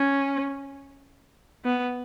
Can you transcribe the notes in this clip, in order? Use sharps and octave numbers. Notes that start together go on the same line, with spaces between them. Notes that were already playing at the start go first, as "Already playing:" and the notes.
Already playing: C#4
B3